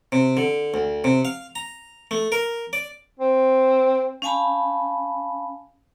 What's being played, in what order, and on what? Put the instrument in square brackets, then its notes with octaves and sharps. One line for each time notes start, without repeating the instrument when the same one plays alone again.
[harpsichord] C3
D3
D2
C3
F5
A#5
A3
A#4
D5
[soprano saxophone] C4
[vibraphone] C#4 F5 G#5 A5 B5